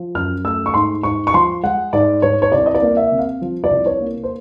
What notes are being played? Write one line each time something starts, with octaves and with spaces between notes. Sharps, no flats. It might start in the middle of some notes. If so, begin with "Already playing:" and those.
Already playing: F3
F#2 F6
A3 E6
C#6
G#2 C6
G#2 C#6
C#6
F3 C6
G#3 F#5
G#2 D5
G#2 C#5
C#5
C2 D5
D#5
D5
A#3
E5
C3
F5
F3
D5
C2
C#5
A#3
C5